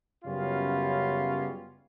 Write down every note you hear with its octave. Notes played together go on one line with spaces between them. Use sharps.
F#2 C#3 G3 B3 C#4 F4